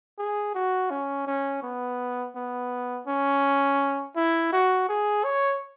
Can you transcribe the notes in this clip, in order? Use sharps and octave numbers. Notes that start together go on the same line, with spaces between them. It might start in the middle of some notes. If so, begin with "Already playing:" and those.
G#4
F#4
C#4
C#4
B3
B3
C#4
E4
F#4
G#4
C#5